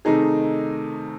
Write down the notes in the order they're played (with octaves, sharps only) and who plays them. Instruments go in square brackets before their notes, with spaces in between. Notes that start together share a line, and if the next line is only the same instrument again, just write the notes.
[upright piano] C3 D#3 A3 D#4 G#4